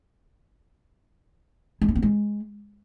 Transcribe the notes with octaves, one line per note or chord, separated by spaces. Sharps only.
G#3
D#4
B3
G#3